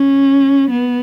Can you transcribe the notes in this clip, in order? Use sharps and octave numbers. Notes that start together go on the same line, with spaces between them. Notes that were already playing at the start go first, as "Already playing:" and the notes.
Already playing: C#4
B3